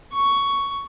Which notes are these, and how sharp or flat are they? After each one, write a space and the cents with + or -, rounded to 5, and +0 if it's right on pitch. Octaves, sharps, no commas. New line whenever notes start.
C#6 +10